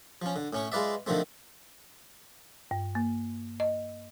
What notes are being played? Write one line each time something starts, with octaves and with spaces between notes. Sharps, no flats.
F3 C#4
D3
A2 C#4 C#6
G#3 F4 B4 D5 E5
D3 D#3 F3 A3 C4
G2
A#3
D#5